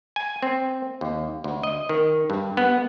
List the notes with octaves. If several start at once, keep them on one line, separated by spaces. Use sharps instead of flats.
G#5
C4
D#2
D2
D#5
D#3
G2
B3